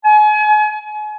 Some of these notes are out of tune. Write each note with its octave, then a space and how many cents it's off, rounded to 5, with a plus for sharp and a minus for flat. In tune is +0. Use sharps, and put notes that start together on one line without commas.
G#5 +35